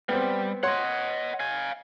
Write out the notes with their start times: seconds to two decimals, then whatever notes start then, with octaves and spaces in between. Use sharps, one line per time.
0.09 G3 B3 C4
0.63 C#5 D#5 F#5 C6
1.40 F5 G#5